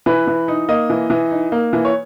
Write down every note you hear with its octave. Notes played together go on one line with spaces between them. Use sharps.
E3 B4
E3
D#4
A#3 D#5
E3
E3
D#4
A#3
E3
C#5